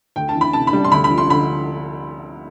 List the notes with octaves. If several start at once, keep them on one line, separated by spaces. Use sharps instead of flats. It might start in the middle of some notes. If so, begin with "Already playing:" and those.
D2 G5
A5
E3
B5
C3 A5
B5
G3
C6
D2 B5
B5
F3
C6
D3 B5